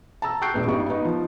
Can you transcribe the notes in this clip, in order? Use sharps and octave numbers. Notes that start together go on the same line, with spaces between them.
A5 A#5 E6
C#6 F#6 G6 C7 D7
E1 A#1 B3
A1 G2 D#4 C#6
B3 D#4
F3